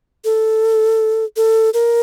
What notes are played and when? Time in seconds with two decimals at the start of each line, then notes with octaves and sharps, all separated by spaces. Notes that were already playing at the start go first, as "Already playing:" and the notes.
0.25 A4
1.37 A4
1.74 A#4